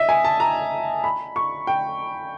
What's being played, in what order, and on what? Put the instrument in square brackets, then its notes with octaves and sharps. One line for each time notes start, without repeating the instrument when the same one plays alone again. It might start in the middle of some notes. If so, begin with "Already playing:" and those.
Already playing: [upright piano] D#5 E5
G#5
A5
A#5
B5
C#6
G5